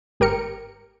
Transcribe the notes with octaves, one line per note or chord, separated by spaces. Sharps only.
G#1 G4 A#4 C#7